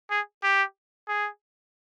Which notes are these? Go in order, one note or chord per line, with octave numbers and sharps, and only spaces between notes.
G#4
G4
G#4